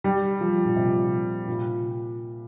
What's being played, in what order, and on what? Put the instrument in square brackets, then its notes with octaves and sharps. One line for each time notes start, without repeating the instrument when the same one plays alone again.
[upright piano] G3
F3
A#2
C3
A#2